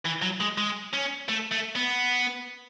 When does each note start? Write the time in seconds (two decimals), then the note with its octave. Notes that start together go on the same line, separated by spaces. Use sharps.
0.06 E3
0.22 F#3
0.41 G#3
0.58 G#3
0.93 C#4
1.28 A3
1.51 A3
1.76 B3